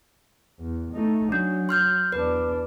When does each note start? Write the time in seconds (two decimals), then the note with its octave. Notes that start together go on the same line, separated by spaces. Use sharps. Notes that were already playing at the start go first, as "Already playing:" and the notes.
0.59 E2
0.94 A3 D#4
1.32 F#3 D4
1.69 C6 F6 G6
2.12 E2 D4 B4